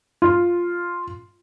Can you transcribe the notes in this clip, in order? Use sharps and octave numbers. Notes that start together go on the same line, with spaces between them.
F4